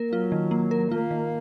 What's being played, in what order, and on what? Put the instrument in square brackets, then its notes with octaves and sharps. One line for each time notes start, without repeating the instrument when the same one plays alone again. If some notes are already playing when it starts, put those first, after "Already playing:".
Already playing: [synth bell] A#3 A#4
[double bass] F#3 [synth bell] F4
[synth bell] D#3
A#3
A#4
[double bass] A#3 [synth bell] F4
[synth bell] D#3